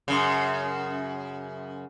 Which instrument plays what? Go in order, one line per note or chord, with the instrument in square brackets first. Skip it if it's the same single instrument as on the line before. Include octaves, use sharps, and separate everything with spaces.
[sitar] F#2 C#3